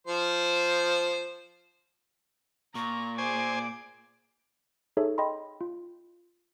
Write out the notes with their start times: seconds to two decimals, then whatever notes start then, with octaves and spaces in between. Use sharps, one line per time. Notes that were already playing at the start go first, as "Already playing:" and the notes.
0.07 F3 C5
2.75 A#2 A#5 C#6
3.18 G#4 C5 G#5 D6
4.97 D#4 G#4 A4 C#5 E5
5.18 D#5 G5 B5 C6
5.61 F4